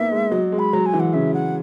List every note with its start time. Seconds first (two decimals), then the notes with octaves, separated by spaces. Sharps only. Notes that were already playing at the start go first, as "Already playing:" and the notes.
Already playing: A#3 B3 D#4 E4 E5
0.12 G#3
0.31 F#3 D#5
0.52 G#3
0.59 B5
0.73 F#3 A#5
0.86 G#5
0.93 E3
1.00 F#5
1.13 C#3 E5
1.34 F#5